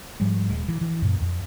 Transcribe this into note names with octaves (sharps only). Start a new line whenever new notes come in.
G#2 F3 G3 G#3
D#1 G#3
E3
E3
F#2 A#2
F2